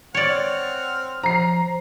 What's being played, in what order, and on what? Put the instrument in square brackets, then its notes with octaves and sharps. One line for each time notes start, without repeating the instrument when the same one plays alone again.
[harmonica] C4 F#5 F6 [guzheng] C#5 D5
[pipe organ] F3 [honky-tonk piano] A#5 C7